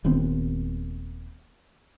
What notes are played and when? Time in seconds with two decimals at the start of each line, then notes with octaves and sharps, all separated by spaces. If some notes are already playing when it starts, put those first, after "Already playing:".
0.04 D#1 D#2 B3 C4